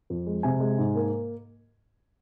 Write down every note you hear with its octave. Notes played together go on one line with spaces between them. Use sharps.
F2
G#3
C3 G#5
G#3
G#2
A#3